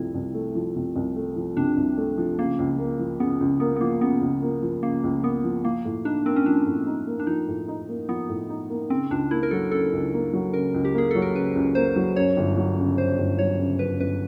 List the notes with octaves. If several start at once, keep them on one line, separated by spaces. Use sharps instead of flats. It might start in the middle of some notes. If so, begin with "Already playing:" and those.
Already playing: C2 C3 F3 A3 E4
C2
A3
F3
C3
C2
A3
F3
C3 D4
C2
A3
F3
C#3 A#3
C#2
A#3
F3
C#3 B3
C#2
A#3 B3
B3
F3 A#3
C#3 B3
C#2
A#3
F3
C#3 A#3
C#2
A#3 B3
F3
F3 A#3
A2
D4 D#4
A#3 C4
C#4
F3 D4
A2
D#4
A#3
D4
F3 D#4
A2
D#4
A#3
F3 B3
A2
D#4
A#3
C#3 C4
C#2 D4
A#3 E4
A#4
F#3 A4
C#3 A4
C#2
A#3
F#3
C#3 A#4
C#2
G4
A#3 G#4
F#3 A4
A#4
C#3 B4
C#2
A#3 C5
F#3
F#2 C#5
G1
F#3
C#3
F#2 C5
G1
F#3 C#5
C#3
F#2 B4
G1 B4